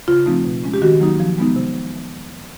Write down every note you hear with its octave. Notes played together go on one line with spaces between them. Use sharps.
C#3 F4
F3 A3 C4 D#4
B2
G#3 C#4
G4
D#3 F#4
F#3 A#3 D#4
F3
G#3 B3 D#4
C3